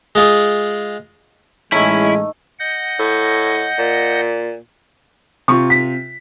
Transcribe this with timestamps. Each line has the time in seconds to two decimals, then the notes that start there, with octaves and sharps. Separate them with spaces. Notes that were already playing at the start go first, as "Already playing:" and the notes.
0.15 G#3 F4 G#4
1.72 A2 E3 G#3 A3 C#4 D#4 E4
2.59 D#5 F#5 G6
2.99 A2
3.78 A#2
5.48 C3 F4 C#6
5.70 B6